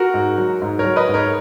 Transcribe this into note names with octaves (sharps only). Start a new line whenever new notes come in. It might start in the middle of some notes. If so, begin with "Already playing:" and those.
Already playing: F#4 A#4
G#2
F#3
G#2
A#4 C#5
F#3
B4 D#5
G#2
A#4 C#5